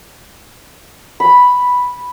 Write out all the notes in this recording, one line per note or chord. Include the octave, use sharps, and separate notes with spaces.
B5